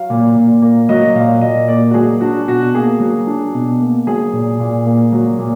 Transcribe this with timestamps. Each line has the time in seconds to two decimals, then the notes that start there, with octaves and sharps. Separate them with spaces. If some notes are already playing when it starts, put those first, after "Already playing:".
Already playing: F#3 F5
0.10 A#2
0.36 A#2
0.62 A#3
0.89 F#3 D#5
1.15 A#2 F5
1.41 A#2 D#5
1.68 A#3 D5
1.91 F#4
1.94 F#3 G#4
2.21 D4 F#4
2.48 B2 F#4
2.74 A#3 G#4
3.00 F#3
3.27 D4
3.54 B2
3.80 A#3
4.07 F#3 G#4
4.33 A#2
4.59 A#2
4.86 A#3
5.12 F#3
5.38 A#2